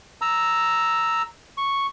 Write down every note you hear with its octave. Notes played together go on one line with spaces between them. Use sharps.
A#5 E6
C#6